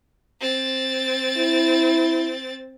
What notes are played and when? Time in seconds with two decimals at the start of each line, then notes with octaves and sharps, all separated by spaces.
0.40 C4 A6
1.37 E4